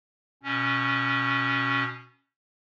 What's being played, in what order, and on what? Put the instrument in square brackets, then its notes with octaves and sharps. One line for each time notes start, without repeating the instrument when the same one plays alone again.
[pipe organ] B2 C#4